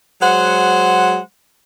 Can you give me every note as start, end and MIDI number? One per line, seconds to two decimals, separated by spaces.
0.22 1.18 54
0.22 1.18 56
0.22 1.18 72
0.22 1.18 78